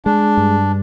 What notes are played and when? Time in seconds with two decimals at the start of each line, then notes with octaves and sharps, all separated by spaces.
0.05 G#3 D4
0.37 G2